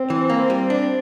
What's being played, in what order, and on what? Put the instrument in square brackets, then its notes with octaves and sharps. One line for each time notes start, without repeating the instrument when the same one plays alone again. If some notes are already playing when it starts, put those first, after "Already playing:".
Already playing: [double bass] C4
[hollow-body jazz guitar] E3
A#3
G3
D4